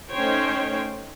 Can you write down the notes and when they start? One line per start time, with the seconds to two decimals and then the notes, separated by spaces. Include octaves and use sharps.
0.11 A3 C#4 D#4 C5 C#5 G5